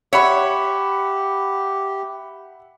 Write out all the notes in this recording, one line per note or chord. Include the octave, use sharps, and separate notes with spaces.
G4 C#5 E5 F#5 B5